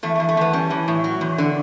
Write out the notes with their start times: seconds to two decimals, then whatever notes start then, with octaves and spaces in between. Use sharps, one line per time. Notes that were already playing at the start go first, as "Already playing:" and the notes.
0.03 E2 A3
0.15 A3
0.20 E2
0.29 A3
0.37 E2 B3
0.53 G3 C#4
0.70 E3
0.88 A2
1.04 F#3
1.21 E2
1.38 D3